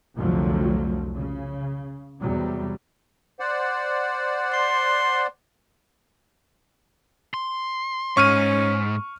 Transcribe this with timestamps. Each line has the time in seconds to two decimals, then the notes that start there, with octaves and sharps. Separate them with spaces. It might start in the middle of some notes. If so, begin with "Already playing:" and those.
0.15 C2 F2 D3 F3 F#3 A3
1.16 C#3
2.20 E2 C3 F#3 G3
3.40 C5 D5 F#5
4.53 C6
7.34 C6
8.17 G#2 C#4 C#6 F6 D#7